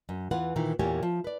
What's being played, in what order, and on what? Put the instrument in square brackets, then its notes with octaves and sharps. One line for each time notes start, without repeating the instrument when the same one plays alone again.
[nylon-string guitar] F#2
E2 E3 F4 B4 F#5
A#2 D#3 E3
E2 A#2 A#3 G4 C#5 G#5
F3
B4 D5